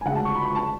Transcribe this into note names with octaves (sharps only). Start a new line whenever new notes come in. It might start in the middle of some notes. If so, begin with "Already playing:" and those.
G#5
D2 C#3 G#3 F#5
A5
C#6
B5
C#6
A5